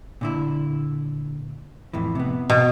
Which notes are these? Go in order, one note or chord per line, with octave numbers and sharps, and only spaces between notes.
A#2 D3 E4
F2 A2 E3
C3 B3
B2